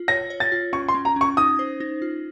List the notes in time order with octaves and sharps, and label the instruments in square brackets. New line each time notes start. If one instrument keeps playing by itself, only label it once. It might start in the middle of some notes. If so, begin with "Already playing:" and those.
Already playing: [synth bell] F4
[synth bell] C#5 [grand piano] A#6
[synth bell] C#5
[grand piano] A6
[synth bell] F4
[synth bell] C#4 [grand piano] C#6
[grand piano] C6
[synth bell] C#4
[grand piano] A#5
[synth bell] C#4 [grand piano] C#6
[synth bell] D#4 [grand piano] D#6
[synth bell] C5
D#4
F4